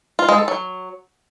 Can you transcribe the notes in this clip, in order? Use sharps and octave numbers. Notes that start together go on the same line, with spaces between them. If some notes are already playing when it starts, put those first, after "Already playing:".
F4
G#3
A4
F#3